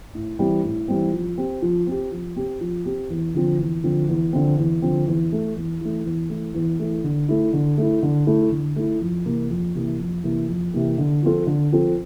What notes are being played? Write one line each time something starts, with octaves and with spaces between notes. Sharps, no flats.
A2
E3 G3 C4
A2
E3 G3 C4
F3
C4 G4
F3
C4 G4
F3
C4 G4
F3
C4 G4
E2
D3 F3 C4
E2
D3 F3 C4
E2
D3 F3 C4
E2
D3 F3 C4
E2
E3 A3
E2
E3 A3
E2
E3 A3
E2
E3 A3
D3
A3 E4
D3
A3 E4
D3
A3 E4
D3
A3 E4
F2
C3 E3 A#3
F2
C3 E3 A#3
F2
C3 E3 A#3
F2
C3 E3 A#3
D3
F3 C4 F4 A4
D3
F3 C4 F4 A4